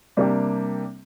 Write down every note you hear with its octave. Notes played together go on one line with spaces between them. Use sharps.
C3 G3 A#3 D4 G4